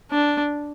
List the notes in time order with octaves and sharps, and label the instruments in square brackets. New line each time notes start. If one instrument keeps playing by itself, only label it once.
[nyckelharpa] D4